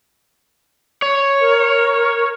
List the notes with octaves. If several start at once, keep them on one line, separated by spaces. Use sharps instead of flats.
C#5
A#4